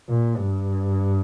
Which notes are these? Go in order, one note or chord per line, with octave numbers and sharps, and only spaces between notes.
A#2
G2